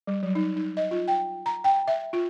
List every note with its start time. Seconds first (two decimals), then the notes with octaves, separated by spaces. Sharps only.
0.07 G3
0.23 F#3
0.35 D#4
0.56 D#4
0.77 D#5
0.91 F4
1.08 G5
1.46 A#5
1.64 G5
1.88 E5
2.13 F4